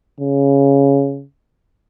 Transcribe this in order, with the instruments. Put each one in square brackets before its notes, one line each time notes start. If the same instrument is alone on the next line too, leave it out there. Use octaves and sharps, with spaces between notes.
[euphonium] C#3